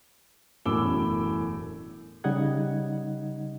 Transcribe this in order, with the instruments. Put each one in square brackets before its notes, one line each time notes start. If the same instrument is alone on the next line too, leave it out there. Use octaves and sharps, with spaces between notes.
[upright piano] E1 F#2 A2 D6 E6 G7
[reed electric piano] C#3 G3 D#4 D#5 F#5 G#6